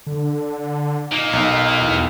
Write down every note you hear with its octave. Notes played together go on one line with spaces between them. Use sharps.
D3
A#2 A#3 D#4
B1
E2